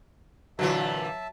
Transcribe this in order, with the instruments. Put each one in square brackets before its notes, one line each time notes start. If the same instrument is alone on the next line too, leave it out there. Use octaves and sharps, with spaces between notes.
[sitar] A#2 D3 E3 [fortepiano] F#3 [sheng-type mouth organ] E5 A5